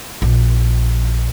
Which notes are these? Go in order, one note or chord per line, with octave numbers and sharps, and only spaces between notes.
A#1